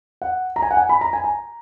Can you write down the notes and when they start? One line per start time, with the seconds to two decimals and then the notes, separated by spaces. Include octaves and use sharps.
0.22 F#5
0.56 A#5
0.62 G#5
0.71 F#5
0.77 G#5
0.89 B5
1.01 A#5
1.13 G#5
1.24 A#5